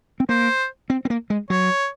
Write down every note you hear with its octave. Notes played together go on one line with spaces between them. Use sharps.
C4
A#3 C5
C4
C4
A#3
G#3
F#3 C#5